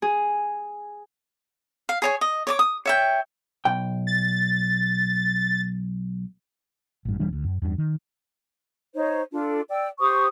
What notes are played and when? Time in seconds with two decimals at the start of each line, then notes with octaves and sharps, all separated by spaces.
0.02 G#4
1.89 F5
2.02 G#4 C#5 G#5
2.21 D#5
2.47 C#5 D5 D6
2.59 D#6
2.86 C#5 E5 G5
3.65 B1 G5
4.07 A6
7.05 A1 G2
7.19 E1 E3 G3 D4
7.33 D2
7.44 F#2
7.62 E2 G2
7.78 D#3
8.94 D#4 C5 C#5
9.32 D4 F4 A4
9.70 D5 G5 E6
9.99 G4 C5 C#6 D#6